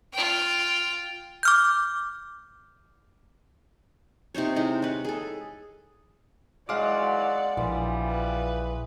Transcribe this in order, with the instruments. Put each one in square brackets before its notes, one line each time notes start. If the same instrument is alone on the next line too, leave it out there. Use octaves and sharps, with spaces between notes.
[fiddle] F4 G5
[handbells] D6 F6 G6
[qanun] C3 D#4 C5 C#5
G#3 D#4 E4 D#5
B4 C#5
G#4 A4
[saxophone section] D#2 E3 F#3 [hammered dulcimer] G#3 [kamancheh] D5 F#5 [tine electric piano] F5 D6
[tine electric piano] A#1 [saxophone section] B2 F3 G3 [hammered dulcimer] E3
[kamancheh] B4